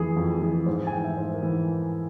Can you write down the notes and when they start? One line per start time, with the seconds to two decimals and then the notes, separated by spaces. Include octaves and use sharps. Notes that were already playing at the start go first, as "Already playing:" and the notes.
Already playing: F2 E3 G#4
0.16 F2
0.41 E3 G#4
0.66 G#2 C5
0.87 G#5
0.92 E3 G5
1.04 E5
1.17 G#2 C5
1.34 A#4
1.43 E3